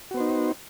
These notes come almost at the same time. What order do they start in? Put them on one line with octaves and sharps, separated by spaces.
F#4 B3 C5 D#4